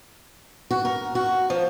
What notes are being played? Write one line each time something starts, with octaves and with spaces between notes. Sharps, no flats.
F#4
A#4
F#4
F3